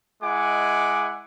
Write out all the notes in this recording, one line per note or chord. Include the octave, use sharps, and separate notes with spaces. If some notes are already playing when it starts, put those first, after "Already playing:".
G#3 E4 D#5 F#5 G#5 D6